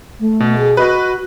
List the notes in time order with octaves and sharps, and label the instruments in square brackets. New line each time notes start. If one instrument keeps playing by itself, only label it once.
[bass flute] A3
[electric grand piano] B2
[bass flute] G#4
[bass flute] F#4 [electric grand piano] B4 D#5 F#6